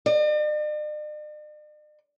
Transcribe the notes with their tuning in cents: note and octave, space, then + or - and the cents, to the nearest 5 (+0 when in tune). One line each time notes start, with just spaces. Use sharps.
D5 +45